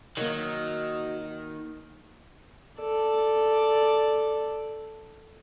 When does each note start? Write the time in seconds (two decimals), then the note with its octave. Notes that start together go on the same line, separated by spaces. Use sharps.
0.17 D#3 F#3 A#3 A#4 D#5
2.79 A4 D5